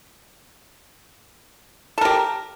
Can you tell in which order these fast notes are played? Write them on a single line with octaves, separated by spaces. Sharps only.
A4 A#4 G4